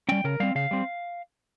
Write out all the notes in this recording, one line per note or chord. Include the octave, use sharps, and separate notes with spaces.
G3 C#4 G5
C#3 A#4
G3 C4 F5
C#3 F5
G3 C4